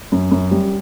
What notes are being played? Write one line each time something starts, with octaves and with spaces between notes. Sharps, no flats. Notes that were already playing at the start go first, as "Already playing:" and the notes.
F#2
F#2
G3